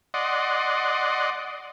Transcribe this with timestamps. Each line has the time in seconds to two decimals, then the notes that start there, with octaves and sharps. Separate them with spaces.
0.14 D5 D#5 F#5 C6